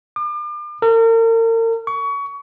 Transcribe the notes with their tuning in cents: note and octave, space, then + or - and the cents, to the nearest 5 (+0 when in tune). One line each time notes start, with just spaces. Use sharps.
D6 +40
A#4 -40
C#6 +25